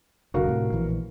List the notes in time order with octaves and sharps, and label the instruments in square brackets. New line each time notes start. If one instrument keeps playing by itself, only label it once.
[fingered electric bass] F1 C2 D3 [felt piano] F#4 A#4 F5
[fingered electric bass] A2 C3
A#1 E3